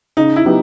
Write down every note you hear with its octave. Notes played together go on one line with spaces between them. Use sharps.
C#3 D#4
E4
F#3 B3 D#4 G4